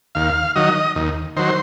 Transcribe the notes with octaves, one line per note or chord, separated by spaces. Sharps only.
D#2 F5
D#3 F#3 D#5
D#2
D#3 F#3 C5